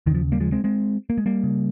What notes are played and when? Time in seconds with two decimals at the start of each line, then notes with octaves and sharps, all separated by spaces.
0.06 D#2 D#3
0.10 C#3 F3
0.32 G3 A#3
0.40 F3 G#3
0.52 G#3 C4
0.64 G#3 C4
1.10 A#3
1.18 G#3
1.26 G3 A#3
1.43 C#3